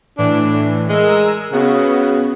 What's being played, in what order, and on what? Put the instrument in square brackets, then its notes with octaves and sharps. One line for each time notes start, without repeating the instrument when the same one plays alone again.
[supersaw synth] A2 E3 [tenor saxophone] D4
[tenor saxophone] G#3 [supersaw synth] G#4 A#4 E6
[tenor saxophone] C#3 [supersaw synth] B3 F#4